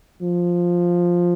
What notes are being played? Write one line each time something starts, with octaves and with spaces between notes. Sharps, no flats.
F3